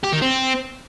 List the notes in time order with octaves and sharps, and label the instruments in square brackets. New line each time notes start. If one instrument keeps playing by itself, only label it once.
[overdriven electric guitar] G4
D#3
C4